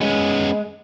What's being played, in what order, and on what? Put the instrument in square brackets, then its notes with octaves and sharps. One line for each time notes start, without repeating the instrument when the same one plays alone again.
[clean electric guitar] G#3 [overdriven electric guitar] B3 C#4